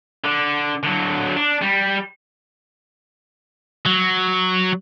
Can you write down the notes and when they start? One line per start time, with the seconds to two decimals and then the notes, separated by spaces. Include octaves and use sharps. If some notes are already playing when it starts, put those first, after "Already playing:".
0.24 D3
0.83 D3 F#3
1.36 D4
1.62 G3
3.86 F#3